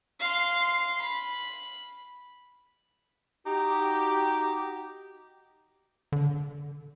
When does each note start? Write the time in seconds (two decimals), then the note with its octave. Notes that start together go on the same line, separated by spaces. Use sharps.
0.20 F5 C6
1.02 B5
3.46 D#4 F#4 G4
6.12 D3